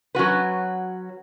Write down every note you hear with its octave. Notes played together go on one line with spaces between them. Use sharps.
F#3 C#4 F#4 B4